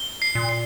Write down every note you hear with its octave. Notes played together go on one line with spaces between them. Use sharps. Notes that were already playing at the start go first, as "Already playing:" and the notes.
Already playing: G7
C7
A#2
C7